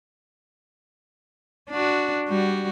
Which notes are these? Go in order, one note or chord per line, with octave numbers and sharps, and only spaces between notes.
D4 F#4
G3 F#4